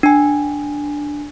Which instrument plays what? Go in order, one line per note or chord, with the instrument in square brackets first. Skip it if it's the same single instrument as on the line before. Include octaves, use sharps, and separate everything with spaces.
[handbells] D4 G#5